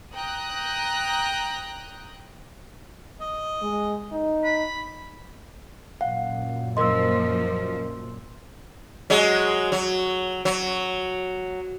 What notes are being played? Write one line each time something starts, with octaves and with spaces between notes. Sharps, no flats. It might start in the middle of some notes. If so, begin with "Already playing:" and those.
G5 A#5 D#6 F#6
D#5
G#3
D#4
B5
F#2 A#2 F5 F#5
F3 A#3 A#4 D#5 C6 E6
F#3 G#3
F#3
F#3